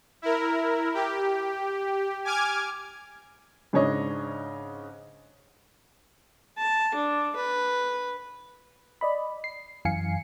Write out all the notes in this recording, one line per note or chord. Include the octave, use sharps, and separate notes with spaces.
E4 A#4
G4
G#5 D6 F6 G#6
G#2 C#3 D4 C#5 D#5
A5
D4
B4
D5 D#5 B5
C7
F#2 E3 F5 G#5 C7 C#7